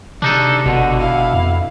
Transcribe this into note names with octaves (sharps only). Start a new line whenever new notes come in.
C3 G#3 D4 D#4 A4
G1 B2 D3 F#4
E4 F5
F2